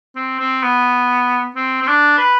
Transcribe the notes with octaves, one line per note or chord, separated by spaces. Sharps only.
C4
C4
B3
C4
C4
D4
B4